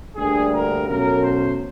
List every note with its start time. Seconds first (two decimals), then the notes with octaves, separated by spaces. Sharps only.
0.16 D2 D3 G3 A#3 D4 G#4
0.52 A#4
0.87 B2 F#3 A3 C#4 A#4
1.22 C5